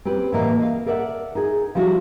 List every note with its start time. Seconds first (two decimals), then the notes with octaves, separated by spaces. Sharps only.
0.05 C4 C#4 G4 B4
0.33 A2 E3 A#3 D#5
0.59 D#5 F5
0.86 A4 A#4 D5 E5 F#5
1.35 D#4 G#4
1.75 F3 G3 E4 F#4